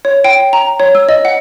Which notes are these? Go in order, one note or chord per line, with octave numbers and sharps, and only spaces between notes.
C#5
G5
A#5
C#5
E6
D#5
F#5